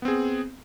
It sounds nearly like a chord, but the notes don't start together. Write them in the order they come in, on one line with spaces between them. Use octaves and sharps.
B3 C4 G#4